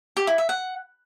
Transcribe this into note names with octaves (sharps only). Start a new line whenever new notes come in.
G4
E4
E5
F#5